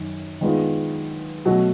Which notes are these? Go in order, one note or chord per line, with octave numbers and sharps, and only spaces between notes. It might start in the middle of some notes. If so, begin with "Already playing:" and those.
Already playing: F#2 D#3
D#3 G#3 B3 D4 F4
B2 F#3 A3